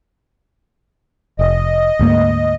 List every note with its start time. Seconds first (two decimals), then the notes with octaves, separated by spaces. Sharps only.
1.39 F1 D#5
1.99 D2 G#2 A#3